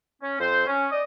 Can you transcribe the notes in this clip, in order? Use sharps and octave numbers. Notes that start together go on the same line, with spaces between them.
C#4
F2 C4 C5
C#4
D5 D#5